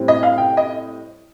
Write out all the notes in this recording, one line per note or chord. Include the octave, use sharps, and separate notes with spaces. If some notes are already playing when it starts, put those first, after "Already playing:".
Already playing: A2 G3 C4
D#5
F5
G5
D#5